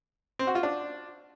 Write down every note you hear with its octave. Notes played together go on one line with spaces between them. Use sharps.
C4
F#4
F4
D4